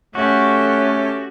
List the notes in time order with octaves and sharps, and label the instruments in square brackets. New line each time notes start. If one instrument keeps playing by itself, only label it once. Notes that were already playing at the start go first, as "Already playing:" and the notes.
[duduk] A3 [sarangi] C#4 [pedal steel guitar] F#4 [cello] G4 A4